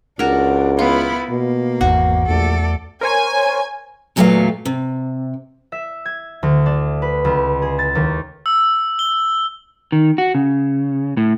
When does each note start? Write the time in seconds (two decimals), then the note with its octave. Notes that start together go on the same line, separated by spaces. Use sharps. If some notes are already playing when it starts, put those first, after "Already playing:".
0.19 C#2 D4 F#4 A#4
0.79 B3 E4 F4
1.30 B2 A#3
1.81 G#1 E2 E3 F#4
2.28 A#1 E2 A3 A4 D5
3.01 A#4 C5 C#5 G#5
4.16 E2 A#2 F#3 A3 B3 F5
4.65 C3
5.72 E5
6.06 G#6
6.43 D2
6.66 D4
7.02 B4
7.25 C#2
7.62 G#4
7.79 A6
7.95 D#2
8.46 E6
8.99 G7
9.92 D#3
10.18 F#4
10.35 C#3
11.17 A2